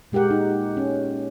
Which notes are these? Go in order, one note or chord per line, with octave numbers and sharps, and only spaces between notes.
A#2 G#3 G4 A#4 F#5
D#4
C#4